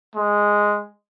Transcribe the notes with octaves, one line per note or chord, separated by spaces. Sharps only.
G#3